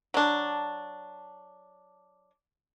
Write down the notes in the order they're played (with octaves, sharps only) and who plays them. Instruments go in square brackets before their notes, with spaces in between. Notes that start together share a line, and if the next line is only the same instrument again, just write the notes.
[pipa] F#3 D4